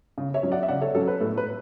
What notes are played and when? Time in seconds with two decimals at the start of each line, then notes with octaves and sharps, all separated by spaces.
0.18 C#3
0.34 C#5 E5
0.43 F#3 C#4
0.52 D5 F#5
0.63 E5
0.68 C#3 D5 F#5
0.81 A4 C#5
0.95 F#3 C#4 A4
1.08 B4
1.21 A2 A4
1.38 B4